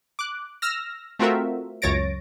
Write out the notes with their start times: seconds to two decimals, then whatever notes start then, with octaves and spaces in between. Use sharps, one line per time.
0.19 D6 F#6
0.62 E6 F6 A#6
1.19 A3 C4 F4 F#4 A#4 E5
1.82 C#2 F#2 C#5 A6 A#6 D7